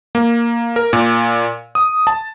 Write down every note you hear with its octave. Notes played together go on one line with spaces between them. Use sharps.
A#3
A#4
A#2
D#6
A5